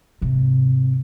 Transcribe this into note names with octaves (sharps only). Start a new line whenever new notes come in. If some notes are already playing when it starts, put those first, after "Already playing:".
G#2 C3